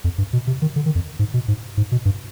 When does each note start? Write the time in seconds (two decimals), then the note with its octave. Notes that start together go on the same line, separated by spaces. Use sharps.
0.04 F2
0.18 G2
0.33 B2
0.47 C3
0.62 D#3
0.76 D3
0.86 D#3
0.95 F2
1.19 G#2
1.34 B2
1.48 G#2
1.77 G#2
1.92 B2
2.05 G2